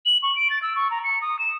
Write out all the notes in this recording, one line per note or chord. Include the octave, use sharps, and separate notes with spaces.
F#7
C#6
D7
A6
E6
C#6
A#5
C#7
D#6
E7